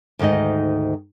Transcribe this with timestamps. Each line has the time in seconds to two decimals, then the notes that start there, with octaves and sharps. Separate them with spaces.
0.19 D2 G#2 D#3 D#4 D#5